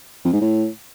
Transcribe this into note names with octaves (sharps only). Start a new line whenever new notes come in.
F2
G#2
A2